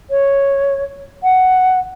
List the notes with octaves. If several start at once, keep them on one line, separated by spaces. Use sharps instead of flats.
C#5
F#5